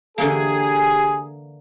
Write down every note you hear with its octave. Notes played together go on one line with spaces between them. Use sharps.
D3 E3 A#3 G4 G#4